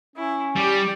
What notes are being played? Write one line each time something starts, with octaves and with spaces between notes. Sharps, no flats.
C#4 E4
G3 G4 D5